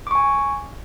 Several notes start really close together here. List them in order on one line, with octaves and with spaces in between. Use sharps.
D6 C#6 G#5